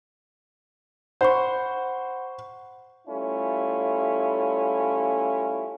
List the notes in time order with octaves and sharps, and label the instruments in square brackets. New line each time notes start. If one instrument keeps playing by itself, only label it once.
[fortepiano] C5 [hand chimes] F#5 B5 C#6
[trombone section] G3 A3 C#4 E4 F4